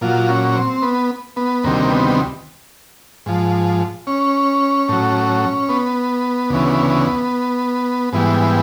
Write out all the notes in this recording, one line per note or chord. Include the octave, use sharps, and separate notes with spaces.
A#2 F#3 F4
C#4
C4
B3
B3
D2 C3 D#3 G3 A#3
B3
G#2 F3
C#4
A2 F#3
B3
D2 C#3 E3
G#2 E3 G3 B3